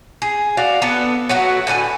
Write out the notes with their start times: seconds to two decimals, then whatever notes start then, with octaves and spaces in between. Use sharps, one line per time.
0.22 G#4
0.57 F#4 D5 F5
0.82 B3 D4 A4
1.29 F#3 A3 B3 F#4
1.67 A2 D3 B4 G#5